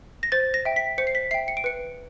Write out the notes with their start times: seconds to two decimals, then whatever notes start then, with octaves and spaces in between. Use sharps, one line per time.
0.23 A#6
0.32 C5 A6
0.54 A#6
0.65 E5 G5
0.76 B6
0.98 C5 C#7
1.07 C7
1.15 B6
1.31 E5 G5 C7
1.48 C#7
1.57 D7
1.64 B4 C#7